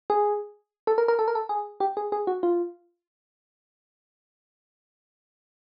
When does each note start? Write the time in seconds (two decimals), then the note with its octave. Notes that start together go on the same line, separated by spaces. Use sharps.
0.10 G#4
0.87 A4
0.98 A#4
1.08 A#4
1.19 A4
1.28 A#4
1.35 A4
1.49 G#4
1.80 G4
1.97 G#4
2.12 G#4
2.27 F#4
2.43 F4